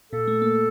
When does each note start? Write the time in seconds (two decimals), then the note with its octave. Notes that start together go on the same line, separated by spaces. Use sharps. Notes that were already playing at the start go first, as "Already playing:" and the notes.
0.12 A#2 A4
0.28 A3
0.42 A#3